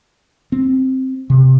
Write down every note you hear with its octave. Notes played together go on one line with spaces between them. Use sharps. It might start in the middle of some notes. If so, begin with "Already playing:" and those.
C4
C3